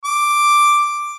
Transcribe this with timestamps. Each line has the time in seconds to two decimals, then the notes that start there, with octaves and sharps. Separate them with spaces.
0.05 D6